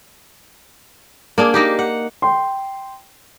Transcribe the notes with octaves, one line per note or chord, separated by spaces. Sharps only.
A#3 D4 G#4
A#3 D#4 G4
F#5
G5 C6